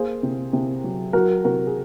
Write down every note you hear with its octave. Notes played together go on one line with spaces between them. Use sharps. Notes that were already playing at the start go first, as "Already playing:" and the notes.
Already playing: A#3 G#4 C5
C3
C3
F#3
F#3 F#4 A#4
C3 F#4 A#4
G#4